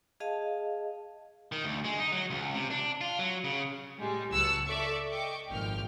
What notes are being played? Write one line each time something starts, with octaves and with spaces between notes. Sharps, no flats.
G#4 D#5 F5 A5
D#3
D2
G#3
D#4
F#3
C#2
C3
D4
F4
F#3
C#3
A2 G3 G#3
C#2 F#3 A5 E6 F#6 C#7
A4 D5 E5 C#6 D6
D#5 G5 C#6 D6
G#1 A#2 F3 G5 F6